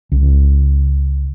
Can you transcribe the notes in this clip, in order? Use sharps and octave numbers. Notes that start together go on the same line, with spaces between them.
C#2